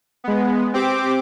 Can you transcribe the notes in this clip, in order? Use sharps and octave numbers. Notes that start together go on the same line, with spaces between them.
G#3 B3
C4 G4 D6